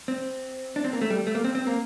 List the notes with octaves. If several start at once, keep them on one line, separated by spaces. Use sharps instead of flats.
C4
D4
C4
A#3
A3
G3
A3
A#3
C4
C4
A#3